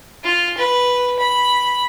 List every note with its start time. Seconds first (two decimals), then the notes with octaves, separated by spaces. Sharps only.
0.24 F4
0.58 B4
1.19 B5